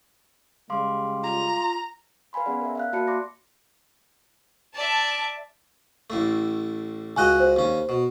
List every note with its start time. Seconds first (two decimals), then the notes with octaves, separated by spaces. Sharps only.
0.70 C#3 G3 G#3 F5 C6 D6
1.23 F4 A#5
2.33 B4 F5 G#5 B5 C6
2.45 B3 C#4 G#4 D5 F#5
2.61 A#4 E5
2.75 E5 F5 F#6
2.93 A#3 F#4 D5 A5 B5 C#7
3.07 D5 C6 D6 A#6
4.75 D5 E5 A5
6.10 A1 A2 A3
7.17 C#2 F#4 D#5 G#5 F#6
7.40 C5
7.56 D#2 C#4
7.89 B2